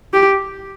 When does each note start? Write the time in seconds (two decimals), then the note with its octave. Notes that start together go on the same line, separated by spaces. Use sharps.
0.14 G4